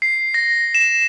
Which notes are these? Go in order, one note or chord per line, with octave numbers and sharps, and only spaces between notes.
C7
A#6
E7